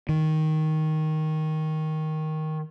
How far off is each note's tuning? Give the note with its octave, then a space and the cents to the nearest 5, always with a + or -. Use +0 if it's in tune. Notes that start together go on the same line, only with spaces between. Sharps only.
D#3 +5